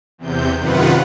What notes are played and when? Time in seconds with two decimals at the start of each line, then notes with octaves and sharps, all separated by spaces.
0.18 E2 C3 G6
0.59 F#2 C3 D#3 F4 B4 F#5